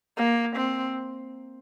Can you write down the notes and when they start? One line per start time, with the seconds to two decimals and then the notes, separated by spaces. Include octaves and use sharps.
0.17 A#3
0.56 C4